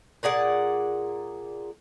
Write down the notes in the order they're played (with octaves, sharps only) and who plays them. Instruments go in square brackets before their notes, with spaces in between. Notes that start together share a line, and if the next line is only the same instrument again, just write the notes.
[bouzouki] A#2 G#4 D5 F#5